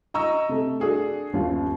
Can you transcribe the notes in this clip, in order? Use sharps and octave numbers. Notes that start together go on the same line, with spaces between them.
D#5 A#5 C#6 E6
C3 A3
D4 F#4 G#4 A4
G1 D#2 C#4 F4